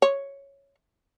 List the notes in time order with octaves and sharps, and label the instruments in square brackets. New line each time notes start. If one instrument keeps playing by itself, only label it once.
[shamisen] C#5